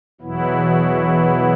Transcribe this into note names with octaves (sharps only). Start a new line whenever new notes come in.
E2 B2 F#3 B3 E4